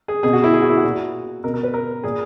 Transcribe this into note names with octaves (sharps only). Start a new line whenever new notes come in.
G#4
B2 G#4
F#4
E4
G#4
F#4
E4
F#4
A#2
B2 A#4
A#4
B4
A#4
A#2 G#4